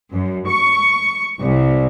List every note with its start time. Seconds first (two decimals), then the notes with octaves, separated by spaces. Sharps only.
0.13 F#2
0.48 C#6
1.40 C2